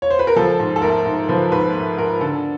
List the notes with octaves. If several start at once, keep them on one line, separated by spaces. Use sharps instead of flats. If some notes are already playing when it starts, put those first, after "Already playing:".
C#5
C5
B4
A#4
F3 A4
G#2
A4
A3 A#4
G#2
F3 B4
G#2 B4
A3
G#2 A#4
D3 A4